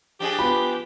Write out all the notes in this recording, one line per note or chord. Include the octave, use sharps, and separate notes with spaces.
F3 D4 G4 G#4
B3 F4 B5